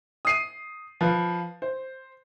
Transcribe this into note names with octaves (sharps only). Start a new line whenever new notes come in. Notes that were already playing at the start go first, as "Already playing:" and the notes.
D#6 C7 D#7
F3 B4 F5
C5